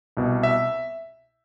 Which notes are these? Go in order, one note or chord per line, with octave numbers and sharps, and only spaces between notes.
C2 B2
E5